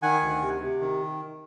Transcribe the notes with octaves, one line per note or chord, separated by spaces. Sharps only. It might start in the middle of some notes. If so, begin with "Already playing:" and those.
D#3 F#5 G#5
D2
C3
C3
D#3